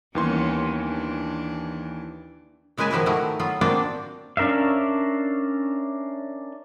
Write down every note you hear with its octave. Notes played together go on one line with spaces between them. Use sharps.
D#2 E3 G3 B3 C#4 C6
D4
C#3 G#3 A#4 B4 G#5 A5
B2 D#3 F3 E4 G4 B4
D#3 A3 E4 F#4 A#4
F#3 B3 F4
A#3 C4 D4 F4 F#4 D5
C#4 D4 A#4 E5 F5